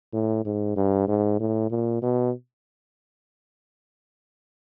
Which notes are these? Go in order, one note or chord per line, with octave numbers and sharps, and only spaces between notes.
A2
G#2
G2
G#2
A2
A#2
B2